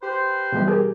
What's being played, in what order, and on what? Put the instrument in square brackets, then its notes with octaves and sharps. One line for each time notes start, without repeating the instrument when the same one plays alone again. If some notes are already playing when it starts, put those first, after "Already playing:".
[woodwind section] G4 B4 C5
[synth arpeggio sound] B2 E3 G3
G4 G#4 A#4